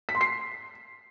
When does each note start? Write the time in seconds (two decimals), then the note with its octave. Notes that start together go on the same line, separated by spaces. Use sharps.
0.09 B6
0.15 C6
0.21 C7